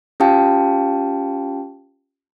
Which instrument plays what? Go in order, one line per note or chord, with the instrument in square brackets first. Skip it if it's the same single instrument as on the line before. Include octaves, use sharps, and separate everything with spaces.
[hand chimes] C#4 F4 G4 F5 G5 A5